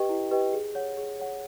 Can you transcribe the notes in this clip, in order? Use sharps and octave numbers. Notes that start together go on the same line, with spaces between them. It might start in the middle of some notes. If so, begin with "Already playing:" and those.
Already playing: G4 B4 D#5 G5
E4
G4 B4 D#5 G5
G#4
C#5 F#5
G#4
C#5 F#5